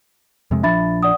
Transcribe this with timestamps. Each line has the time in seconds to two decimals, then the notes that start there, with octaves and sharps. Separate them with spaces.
0.51 F2 C3 G#3
0.63 A#1 F3 D4 E5 B5 A6
1.03 D5 F#5 D#6